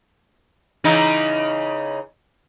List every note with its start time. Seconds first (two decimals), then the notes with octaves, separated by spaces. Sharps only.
0.84 C#3 E3 D#4